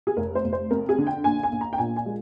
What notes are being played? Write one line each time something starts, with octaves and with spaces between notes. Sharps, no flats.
G#4
F1 A#4
C5
F1
C5
F2 A#4
G#4
D3
G5
A#1 G#5
G#5
A#1
A#5
G5
A#2 G#5
G#5
G#3